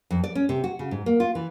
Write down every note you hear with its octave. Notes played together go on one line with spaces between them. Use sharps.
F2
D5
C#4
C3
F#4
C#3
G#2
A#3
F4
E3